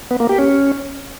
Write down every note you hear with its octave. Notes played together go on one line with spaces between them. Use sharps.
B3
A#3
G4
C#4